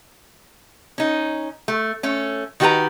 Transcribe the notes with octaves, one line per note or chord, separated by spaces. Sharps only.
C#4 D#4
A3
A3 C#4
D#3 F#4 G4 A4 B4 A#5